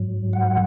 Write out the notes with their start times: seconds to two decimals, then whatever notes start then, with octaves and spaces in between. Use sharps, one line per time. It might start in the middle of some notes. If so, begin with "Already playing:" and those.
Already playing: G#2 F#3
0.33 F#5